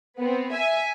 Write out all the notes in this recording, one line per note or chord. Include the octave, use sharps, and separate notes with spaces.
B3 C4
E5 G#5